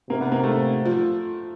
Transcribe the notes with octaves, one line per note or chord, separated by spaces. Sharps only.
C3 A#3
B3
A#3
A3
F3